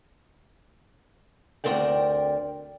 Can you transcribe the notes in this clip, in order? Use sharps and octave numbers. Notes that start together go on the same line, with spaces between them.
D2 G2 C4 A#4 D5 G5